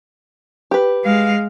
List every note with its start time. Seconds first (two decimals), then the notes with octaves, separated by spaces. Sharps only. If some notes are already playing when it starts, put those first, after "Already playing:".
0.71 G4 B4
1.04 G#3 F5